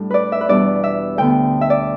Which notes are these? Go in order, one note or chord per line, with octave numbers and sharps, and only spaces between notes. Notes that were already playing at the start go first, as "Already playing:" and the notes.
Already playing: A2 G3 D4
B4 D5
E5
B4
E2 B2 G3 D4 D5
E5
D2 D3 B3 G5
E5
D5